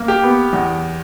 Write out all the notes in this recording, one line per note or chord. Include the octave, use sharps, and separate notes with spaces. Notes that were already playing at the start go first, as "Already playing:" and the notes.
Already playing: A#3
G4
B3
E2